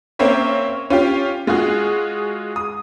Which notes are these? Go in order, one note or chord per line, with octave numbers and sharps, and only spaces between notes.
A#3 C4 C#4 C#5 E5
C#4 F4 G4
G#3 F4 F#4 G#4
D#6